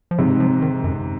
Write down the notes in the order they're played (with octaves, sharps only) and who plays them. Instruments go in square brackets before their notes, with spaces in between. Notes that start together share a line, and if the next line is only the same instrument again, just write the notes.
[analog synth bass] F3
[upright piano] G#2 C3 [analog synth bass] F#3
[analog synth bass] F3
D#3
F#2